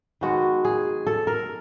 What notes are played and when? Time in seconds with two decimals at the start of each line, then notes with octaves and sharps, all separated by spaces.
0.21 D#3 G#3 B3 F#4
0.65 G#4
1.07 A4
1.27 A#4